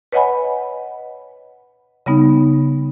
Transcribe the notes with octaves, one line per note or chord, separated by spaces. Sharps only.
B4 C#5 D#5 F#5 G#5 B5
C#3 G3 B3 D#4